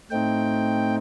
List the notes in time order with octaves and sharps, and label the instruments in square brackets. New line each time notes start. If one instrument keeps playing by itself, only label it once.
[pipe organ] A2 A3 C4 D#4 G5